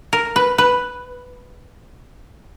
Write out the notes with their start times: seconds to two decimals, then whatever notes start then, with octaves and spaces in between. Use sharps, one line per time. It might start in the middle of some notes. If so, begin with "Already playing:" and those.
0.13 A#4
0.36 B4
0.58 B4